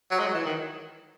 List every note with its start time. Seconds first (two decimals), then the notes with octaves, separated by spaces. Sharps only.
0.11 F#3
0.19 G#3
0.27 F#3
0.34 E3
0.45 D#3